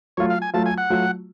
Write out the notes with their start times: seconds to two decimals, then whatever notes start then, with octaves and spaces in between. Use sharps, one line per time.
0.17 F#3 A3 F4 C#5
0.30 F5
0.42 G#5
0.54 F#3 A3 F4 A5
0.66 G#5
0.78 F#5
0.90 F#3 A3 F4